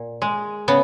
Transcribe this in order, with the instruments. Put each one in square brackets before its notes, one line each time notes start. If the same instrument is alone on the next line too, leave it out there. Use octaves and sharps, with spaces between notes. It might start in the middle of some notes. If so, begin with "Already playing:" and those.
Already playing: [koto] A#2
G#3
C#3 B3